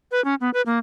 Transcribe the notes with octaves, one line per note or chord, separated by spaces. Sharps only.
B4
C#4
B3
B4
A#3